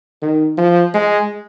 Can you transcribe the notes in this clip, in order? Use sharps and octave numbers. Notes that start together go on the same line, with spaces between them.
D#3
F3
G#3